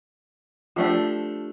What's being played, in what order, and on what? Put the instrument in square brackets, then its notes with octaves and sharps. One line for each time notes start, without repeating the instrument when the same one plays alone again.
[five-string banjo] F3 A3 D4 G4 [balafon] F4